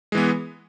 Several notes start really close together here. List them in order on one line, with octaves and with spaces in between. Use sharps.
G#3 E3 B3